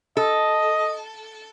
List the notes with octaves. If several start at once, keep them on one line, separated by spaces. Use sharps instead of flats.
A4 D#5